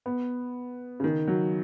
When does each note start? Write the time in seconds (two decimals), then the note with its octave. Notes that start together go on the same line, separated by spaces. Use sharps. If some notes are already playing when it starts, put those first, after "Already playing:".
0.06 B3
1.00 C#3
1.04 D#3
1.28 F#3